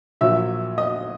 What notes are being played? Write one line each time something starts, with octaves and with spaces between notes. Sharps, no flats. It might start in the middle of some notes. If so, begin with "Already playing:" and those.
A#1 A#2 F#3 E5 E6
D#5 D#6